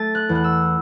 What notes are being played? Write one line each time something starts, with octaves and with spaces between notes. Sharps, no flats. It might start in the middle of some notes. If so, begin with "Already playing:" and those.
Already playing: A3 A6
F#6
E2
F#6
E6